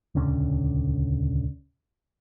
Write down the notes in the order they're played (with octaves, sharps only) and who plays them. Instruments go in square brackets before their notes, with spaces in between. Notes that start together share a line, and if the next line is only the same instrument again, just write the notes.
[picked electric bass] D#1 C#2 D3 C#4